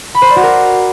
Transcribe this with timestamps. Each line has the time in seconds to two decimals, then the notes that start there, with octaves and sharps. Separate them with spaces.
0.15 B5
0.22 C5
0.29 D5
0.36 F#4
0.43 A#4